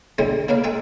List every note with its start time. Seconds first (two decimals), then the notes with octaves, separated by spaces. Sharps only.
0.18 E2 A2 D3 E3 G3 G#3
0.48 C#3 A#3 B4 F5
0.64 G#3 A4 G5 G#5